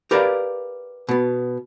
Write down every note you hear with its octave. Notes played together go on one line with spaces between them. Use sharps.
G4 A#4 B4 D5 F5
B2 B3